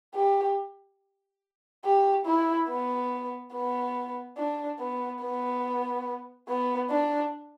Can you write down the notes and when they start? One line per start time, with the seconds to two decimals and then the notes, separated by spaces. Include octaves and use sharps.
0.15 G4
1.85 G4
2.26 E4
2.69 B3
3.53 B3
4.38 D4
4.80 B3
5.22 B3
6.48 B3
6.90 D4